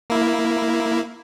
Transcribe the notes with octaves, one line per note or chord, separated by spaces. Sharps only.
A#3 E4